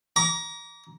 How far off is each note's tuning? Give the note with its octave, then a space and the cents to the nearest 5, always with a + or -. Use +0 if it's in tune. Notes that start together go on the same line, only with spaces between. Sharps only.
A#5 +20 D6 -30